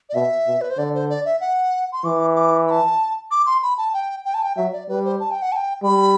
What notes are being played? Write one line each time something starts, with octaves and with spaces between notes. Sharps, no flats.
D5
B2 E5
B2
B4
C5
D3 D5
C5
D5
E5
F#5
C6
E3 D6
D6
B5
A5
D6
C6
B5
A5
G5
G5
A5
G5
F#3 E5
D5
G3 B4
C5
A5
G5
F#5
A5
G5
G3 B5